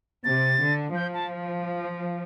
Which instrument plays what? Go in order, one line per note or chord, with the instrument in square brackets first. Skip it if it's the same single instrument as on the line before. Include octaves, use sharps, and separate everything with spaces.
[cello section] C3 [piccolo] A6
[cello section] D3
[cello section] F3 [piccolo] G6
[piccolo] A5